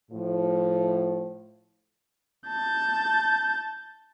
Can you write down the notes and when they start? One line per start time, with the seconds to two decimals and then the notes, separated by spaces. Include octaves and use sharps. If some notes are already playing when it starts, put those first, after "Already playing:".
0.11 A2 F3
2.48 A5 G6